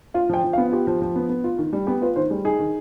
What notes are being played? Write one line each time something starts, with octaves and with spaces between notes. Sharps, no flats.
F4 F5
F3 G5
F3
F5
B3
F4 G4
F3
F3
B3
B3
F4
D#3
G3
B3 G4
F4 B4
D#3 C5
G3 G#4
D#4 G#4
D#3